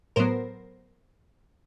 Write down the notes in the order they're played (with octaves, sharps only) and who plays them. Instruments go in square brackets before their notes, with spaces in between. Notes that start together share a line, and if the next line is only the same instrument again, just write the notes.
[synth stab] A2 F#3 B3 A#4 C5